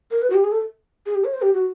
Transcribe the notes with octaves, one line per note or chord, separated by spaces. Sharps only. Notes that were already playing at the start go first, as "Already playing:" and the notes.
A#4
B4
F#4
G4
G#4
A4
G#4
G4
C#5
C5
G4
F#4